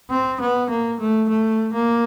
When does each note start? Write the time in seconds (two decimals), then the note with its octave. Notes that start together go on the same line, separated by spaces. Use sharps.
0.10 C4
0.40 B3
0.69 A#3
1.00 A3
1.29 A3
1.73 A#3